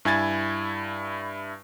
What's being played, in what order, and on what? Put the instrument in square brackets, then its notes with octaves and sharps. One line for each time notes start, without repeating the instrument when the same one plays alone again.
[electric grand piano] G2 E4 G#5 G#6 A6